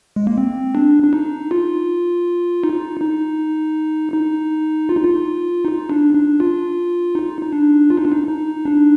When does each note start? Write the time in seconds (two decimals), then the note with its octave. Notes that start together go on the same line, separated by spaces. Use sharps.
0.16 G#3
0.27 A#3
0.38 C4
0.75 D4
1.03 D4
1.13 D#4
1.51 F4
2.64 D#4
3.01 D#4
4.14 D#4
4.89 F4
4.97 D#4
5.04 F4
5.65 D#4
5.90 D4
6.15 D4
6.40 F4
7.15 D#4
7.42 D#4
7.53 D4
7.90 F4
7.97 D#4
8.05 D4
8.12 D#4
8.28 D#4
8.65 D4